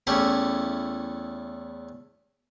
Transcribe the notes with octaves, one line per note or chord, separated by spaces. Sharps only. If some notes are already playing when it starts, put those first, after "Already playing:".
E2 A3 C#4 E4 G4